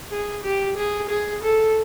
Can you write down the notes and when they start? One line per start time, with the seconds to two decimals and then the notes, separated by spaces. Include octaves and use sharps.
0.11 G#4
0.44 G4
0.77 G#4
1.10 G#4
1.43 A4